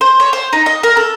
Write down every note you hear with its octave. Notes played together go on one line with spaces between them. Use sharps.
C5
C#5
C5
D#4
D#5
A#4
A4